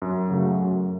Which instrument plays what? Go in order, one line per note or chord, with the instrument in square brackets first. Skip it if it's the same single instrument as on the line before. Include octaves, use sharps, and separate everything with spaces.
[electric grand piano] F#2
C#3 F#3 A3
F#2